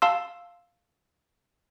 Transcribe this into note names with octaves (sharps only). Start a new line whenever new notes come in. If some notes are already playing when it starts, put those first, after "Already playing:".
F5 A5 C6 E6